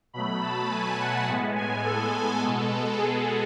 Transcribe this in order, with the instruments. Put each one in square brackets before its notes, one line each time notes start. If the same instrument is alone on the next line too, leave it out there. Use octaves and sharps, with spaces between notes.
[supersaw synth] B2 F#3 A3 B5
A5
G#5
F#5
A2 G#3 B3
G#5
A4
A4
B2 G#3 B3
G#4